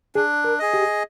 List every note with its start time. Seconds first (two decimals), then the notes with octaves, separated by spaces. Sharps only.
0.15 D4 G#4
0.44 A#4
0.59 G#4 D#5
0.74 G4